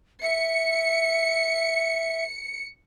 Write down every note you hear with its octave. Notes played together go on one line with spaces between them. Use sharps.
E5 C#7